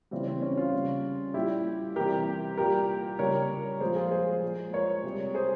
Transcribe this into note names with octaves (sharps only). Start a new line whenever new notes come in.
C#3 E3 G3 C4
C4
C#4
C#4 F4
C#3 G3
A#2 G3 E4 G4
C3 E3 G3 G4 A#4
A#2 G3 G4 A#4
C#3 G3 A#4 C#5
A#2 F3 G#3 G#4 C5
F4 G#4
G#4 C5
A#2 G#3
A#4 C#5
C3 G3
G#4 C5